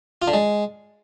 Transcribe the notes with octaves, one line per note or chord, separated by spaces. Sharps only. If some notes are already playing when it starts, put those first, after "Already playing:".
F4
D3
G#3